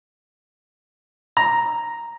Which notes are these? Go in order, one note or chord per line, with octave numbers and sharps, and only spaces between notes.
A#5